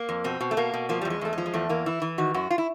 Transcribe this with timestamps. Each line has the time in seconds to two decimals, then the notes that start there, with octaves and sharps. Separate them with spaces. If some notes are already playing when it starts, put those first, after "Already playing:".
Already playing: A#3
0.09 F2
0.24 B2 C4
0.41 B2
0.51 A3
0.57 B2 A#3
0.74 B2
0.89 F3 A#3
1.01 G3
1.05 E2
1.10 G#3
1.21 E2 A3
1.33 G#3
1.38 F3
1.46 G#3
1.54 E2 A3
1.69 E3 A#3
1.86 E3 E4
2.02 E3
2.18 D#3 F#4
2.34 F#2 F#4
2.50 F4
2.58 E4